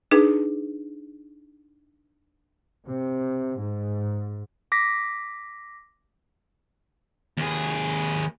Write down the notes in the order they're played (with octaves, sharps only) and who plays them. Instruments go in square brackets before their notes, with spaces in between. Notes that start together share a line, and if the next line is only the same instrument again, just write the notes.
[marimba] D4 D#4 G#4 B4
[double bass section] C3
G#2
[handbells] D6 A#6 B6
[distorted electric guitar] D#2 G#4